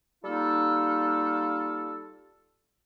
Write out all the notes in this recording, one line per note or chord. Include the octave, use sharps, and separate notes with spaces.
G3 A#3 D#4 F4 A4